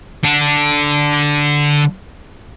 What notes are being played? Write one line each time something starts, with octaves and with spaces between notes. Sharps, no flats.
D3 D4